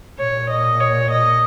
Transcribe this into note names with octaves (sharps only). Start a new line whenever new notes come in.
A#2 C#5
D#5
C#5
D#5